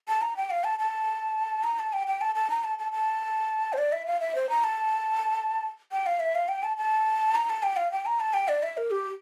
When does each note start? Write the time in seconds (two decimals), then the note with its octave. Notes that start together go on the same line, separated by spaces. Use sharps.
0.08 A5
0.22 A#5
0.37 G5
0.50 F5
0.64 A5
0.79 A5
1.64 A#5
1.79 A5
1.93 G5
2.07 G5
2.21 A5
2.35 A5
2.50 A#5
2.64 A5
2.79 A5
2.92 A5
3.73 C5
3.78 D5
3.92 E5
4.06 F5
4.20 E5
4.35 C5
4.50 A#5
4.64 A5
5.92 G5
6.06 F5
6.20 E5
6.35 F5
6.48 G5
6.63 A5
6.77 A5
7.35 A#5
7.50 A5
7.63 G5
7.77 F5
7.92 G5
8.06 A#5
8.20 A5
8.34 G5
8.48 D5
8.63 E5
8.77 A#4
8.91 G4